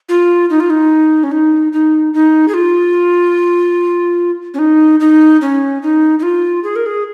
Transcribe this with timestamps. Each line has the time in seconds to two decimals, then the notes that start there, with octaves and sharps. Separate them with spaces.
0.09 F4
0.50 D#4
0.60 F4
0.70 D#4
1.24 C#4
1.31 D#4
1.73 D#4
2.14 D#4
2.48 G#4
2.54 F4
4.54 C#4
4.59 D#4
5.00 D#4
5.41 C#4
5.83 D#4
6.19 D#4
6.23 F4
6.64 G#4
6.76 A#4
6.86 G#4